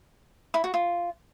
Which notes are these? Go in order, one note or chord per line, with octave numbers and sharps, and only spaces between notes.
E4
F#4
F4